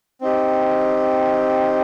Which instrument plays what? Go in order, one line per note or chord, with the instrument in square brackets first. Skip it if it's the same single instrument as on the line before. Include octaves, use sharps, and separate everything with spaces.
[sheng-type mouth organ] C4 D#4 G4